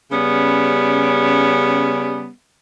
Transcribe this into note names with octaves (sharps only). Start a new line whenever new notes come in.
C#3 G3 B3 C#4